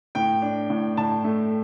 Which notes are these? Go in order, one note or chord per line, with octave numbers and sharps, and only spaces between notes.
A2 G5
D4
A2
A2 A5
A3